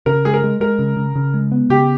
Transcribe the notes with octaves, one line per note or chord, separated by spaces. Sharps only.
C#3 A#4
G#3 G#4
A#4
G#3
G#3 A#4
C#3
C#3
C#3
G#3
B3
C#3 G4